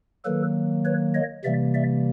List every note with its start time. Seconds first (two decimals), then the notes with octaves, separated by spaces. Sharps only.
0.25 D#3 F#3 A#3 A4 B4
0.85 B4 C#5
1.14 C#5 D#5
1.44 C3 E3 G3 A#3 D5 E5
1.74 D5 E5